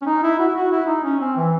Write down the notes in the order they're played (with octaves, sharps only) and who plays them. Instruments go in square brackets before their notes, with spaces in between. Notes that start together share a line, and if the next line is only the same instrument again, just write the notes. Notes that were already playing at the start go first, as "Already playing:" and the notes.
[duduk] C#4
D#4
E4
F#4
E4
F#4
E4
D#4
C#4
C4
E3